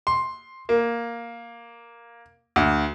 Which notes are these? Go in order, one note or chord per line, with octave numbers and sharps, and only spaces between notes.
C6
A#3
D2